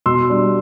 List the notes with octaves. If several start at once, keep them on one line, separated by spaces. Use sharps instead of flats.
B2 C6 E6
G3 D4